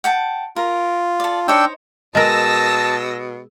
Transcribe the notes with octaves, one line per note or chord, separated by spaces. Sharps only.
F#5 G5 A5
F4 A#4
A4 D5
D4 D#4 C5 C#5 G5 E6
B2 G#3 A#4 A5 D#6 E6 A#6